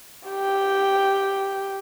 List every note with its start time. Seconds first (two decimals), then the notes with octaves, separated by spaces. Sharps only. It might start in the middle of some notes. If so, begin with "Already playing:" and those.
0.28 G4 G5